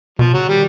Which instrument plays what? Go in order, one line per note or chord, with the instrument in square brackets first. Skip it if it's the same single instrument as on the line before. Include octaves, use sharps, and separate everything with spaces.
[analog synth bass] B2 [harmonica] F3
[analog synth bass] C#3 [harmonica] F#3
[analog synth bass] D#3 [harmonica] G3